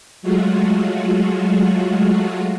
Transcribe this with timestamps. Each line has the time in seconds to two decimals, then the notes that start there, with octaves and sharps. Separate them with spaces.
0.22 F#3 G#3 A3 F4 F#4